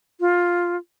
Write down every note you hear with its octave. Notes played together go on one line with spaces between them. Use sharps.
F4